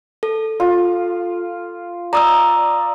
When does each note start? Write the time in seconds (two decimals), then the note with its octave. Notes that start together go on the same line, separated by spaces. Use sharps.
0.23 A4
0.60 F4
2.13 D5 A#5 D#6 E6